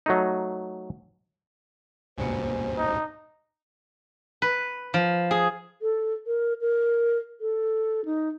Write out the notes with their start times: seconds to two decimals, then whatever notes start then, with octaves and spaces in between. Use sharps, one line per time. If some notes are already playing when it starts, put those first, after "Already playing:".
0.06 F#3 A3 D#4
2.18 C#2 G2 B2 A#3 C5 G#5
2.78 D#4
4.42 B4
4.94 F3
5.31 G#4
5.82 A4
6.27 A#4
6.61 A#4
7.41 A4
8.05 D#4